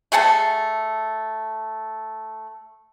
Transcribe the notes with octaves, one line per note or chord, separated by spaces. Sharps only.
A3 G#4 F#5 A5